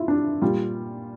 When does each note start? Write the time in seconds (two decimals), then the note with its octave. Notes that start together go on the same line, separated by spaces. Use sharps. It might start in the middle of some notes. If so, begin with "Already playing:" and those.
Already playing: E4 F4
0.08 D4
0.42 A#2 G3 F4